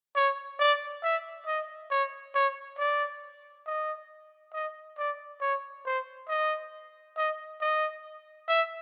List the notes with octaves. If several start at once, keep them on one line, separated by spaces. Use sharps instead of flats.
C#5
D5
E5
D#5
C#5
C#5
D5
D#5
D#5
D5
C#5
C5
D#5
D#5
D#5
E5